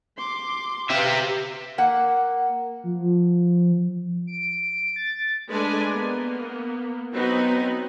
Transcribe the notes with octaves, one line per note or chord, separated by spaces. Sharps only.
C6 D6
G4 B4 E5 F5
A#3 F#5
F3
D7
A6
G#3 A3 D4 B4 D5 G#5
A#3 B3
F#3 B3 C4 D#4 B5